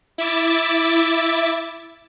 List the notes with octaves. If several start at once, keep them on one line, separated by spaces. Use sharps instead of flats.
E4 E5 D6 A6